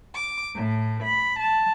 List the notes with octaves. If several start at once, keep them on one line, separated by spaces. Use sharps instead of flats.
D6
A2
B5
A5